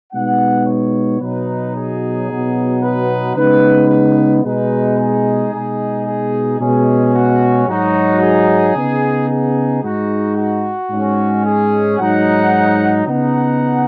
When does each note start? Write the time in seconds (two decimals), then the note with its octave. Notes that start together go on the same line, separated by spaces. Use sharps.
0.13 B2 G#3 B3 D#4 F#5
0.67 C#5
1.21 B2 F#3 D#4 B4
1.75 G#4
2.29 B2 F#3 B3 D#4
2.82 B4
3.36 C#3 G#3 B3 D#4 B4
3.90 B4
4.44 B2 G#3 D#4 B4
4.98 G#4
5.52 B2 G#3 D#4
6.05 G#4
6.59 B2 G#3 C#4 G#4
7.14 F#4
7.67 G#2 F#3 D#4 F#4
8.21 G#4
8.76 C#3 B3 D#4
9.29 G#4
9.82 G#2 G#3 D#4 F#4
10.36 F#4
10.90 G#2 G#3 C#4
11.45 G#4
11.99 G#2 F#3 D#4 F#5
13.06 C#3 B3 D#4 F#5